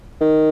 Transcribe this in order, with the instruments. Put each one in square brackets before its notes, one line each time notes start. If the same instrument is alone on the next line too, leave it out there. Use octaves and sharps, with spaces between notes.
[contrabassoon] D#3